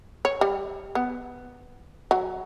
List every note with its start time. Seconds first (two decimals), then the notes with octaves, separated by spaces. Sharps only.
0.25 C#5
0.41 G3
0.95 B3
2.11 F#3